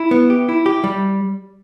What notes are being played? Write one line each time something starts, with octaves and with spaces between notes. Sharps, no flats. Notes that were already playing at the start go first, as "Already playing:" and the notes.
Already playing: E4
B3
G4
E4
G4
G3